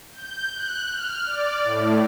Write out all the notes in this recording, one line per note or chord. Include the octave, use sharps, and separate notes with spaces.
G6
F#6
F6
D5
A2